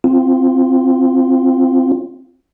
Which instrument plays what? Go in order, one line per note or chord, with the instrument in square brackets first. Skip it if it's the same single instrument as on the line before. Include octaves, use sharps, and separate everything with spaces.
[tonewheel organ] C4 F4